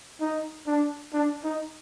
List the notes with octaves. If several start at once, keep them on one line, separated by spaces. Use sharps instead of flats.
D#4
D4
D4
D#4